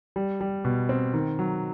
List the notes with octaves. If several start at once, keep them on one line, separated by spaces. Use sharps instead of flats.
G3
G3
B2
C4
D#3
F#3